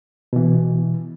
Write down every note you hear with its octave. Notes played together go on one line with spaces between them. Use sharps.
B2 E3